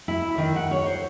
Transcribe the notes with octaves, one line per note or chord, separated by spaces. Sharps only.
E4
D#3
F#5
C#5
C5